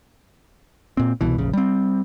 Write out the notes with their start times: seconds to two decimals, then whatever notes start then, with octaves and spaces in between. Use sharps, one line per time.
0.97 A#2 C4
1.21 C2 B2 E3
1.38 F1 A#1 C#3
1.53 G3 C4